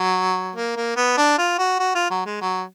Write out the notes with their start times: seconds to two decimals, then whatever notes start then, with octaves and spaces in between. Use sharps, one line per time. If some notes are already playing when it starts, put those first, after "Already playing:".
Already playing: F#3
0.56 A#3
0.77 A#3
0.97 B3
1.17 D4
1.38 F4
1.58 F#4
1.79 F#4
1.95 F4
2.11 F#3
2.26 G#3
2.41 F#3